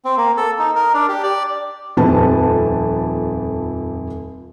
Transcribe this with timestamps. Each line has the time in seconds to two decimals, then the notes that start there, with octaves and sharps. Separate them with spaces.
0.05 C4
0.17 A#3
0.37 A4
0.59 D#4
0.76 A#4
0.94 D4
1.09 G4
1.23 D5
1.97 D#1 F2 C4 B4 A5